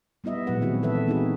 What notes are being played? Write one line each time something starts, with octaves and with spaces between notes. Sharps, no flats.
G3 B3 E4 D#5 E5
A#2 F3 F#3 G#3 B4 F#5
D#3 C4 E4 F#4 G#4
E3 A4 B4 E5
C4
B3 C4 D#4 E4 F#4 G#4